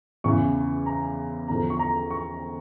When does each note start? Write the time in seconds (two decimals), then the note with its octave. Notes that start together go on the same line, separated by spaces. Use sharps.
0.24 E2 C#3 E3 C#6
0.86 A#5
1.48 E2 D3 F3 A#5
1.70 C#6
1.79 A#5
2.11 C#6